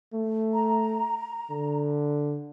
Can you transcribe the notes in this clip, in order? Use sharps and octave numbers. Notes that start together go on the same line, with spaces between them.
A3
A#5
D3